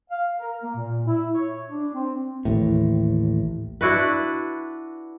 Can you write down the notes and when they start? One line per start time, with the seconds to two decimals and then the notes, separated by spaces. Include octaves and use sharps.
0.10 F5
0.40 A#4
0.63 A#3
0.75 A#2
1.07 E4
1.35 C#5
1.70 D4
1.94 C4
2.45 A1 D#2 A2
3.81 D4 E4 F#4 B4